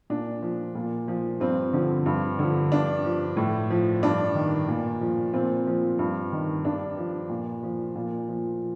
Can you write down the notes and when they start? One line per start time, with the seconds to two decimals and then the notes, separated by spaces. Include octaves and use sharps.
0.10 A#2 D4
0.42 F3
0.75 A#2
1.08 F3
1.40 G2 C4
1.73 D3 F3
2.06 G2
2.39 D3 F3
2.72 G2 D4
3.04 F3
3.37 A2
3.70 F3
4.03 G2 D4
4.35 D#3
4.68 A#2
5.01 F3
5.33 A#2 C4
5.67 F3
5.99 G2
6.32 D#3
6.65 G2 D4
6.98 F3
7.30 A#2
7.63 F3
7.95 A#2
8.29 F3